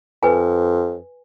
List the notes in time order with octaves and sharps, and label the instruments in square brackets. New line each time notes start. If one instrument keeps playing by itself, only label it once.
[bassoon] F2 [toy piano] B4 G#5